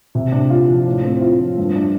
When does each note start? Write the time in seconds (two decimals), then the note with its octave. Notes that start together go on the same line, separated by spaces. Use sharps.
0.15 C3
0.32 D4
0.50 F4
0.68 F3
0.86 A2
1.04 C4
1.21 F4
1.40 F3
1.58 G2
1.75 D4